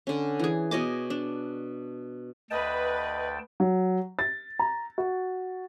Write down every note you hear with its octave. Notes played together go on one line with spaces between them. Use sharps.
D3 C#4
E3 G#4
B2 C#5 D#5 D6
D4
D2 B4 D#5 G5 A5
F#3
A6
A#5
F#4